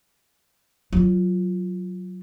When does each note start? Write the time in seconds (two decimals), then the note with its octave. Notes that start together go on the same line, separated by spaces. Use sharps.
0.93 F#3 F4